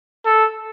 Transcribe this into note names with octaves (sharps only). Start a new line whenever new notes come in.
A4